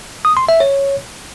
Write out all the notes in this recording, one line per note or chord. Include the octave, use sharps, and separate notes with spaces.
D#6
C6
E5
C#5